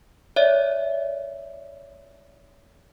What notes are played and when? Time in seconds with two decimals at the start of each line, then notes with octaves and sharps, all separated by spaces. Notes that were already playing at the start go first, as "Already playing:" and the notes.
0.36 C#5 D5 E5